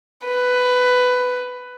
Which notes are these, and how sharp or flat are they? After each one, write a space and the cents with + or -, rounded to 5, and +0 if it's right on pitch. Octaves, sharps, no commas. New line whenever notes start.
B4 +10